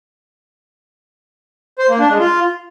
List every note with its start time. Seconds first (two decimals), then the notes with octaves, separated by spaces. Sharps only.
1.79 C5
1.89 A#3
1.99 D4
2.09 G#3
2.20 F4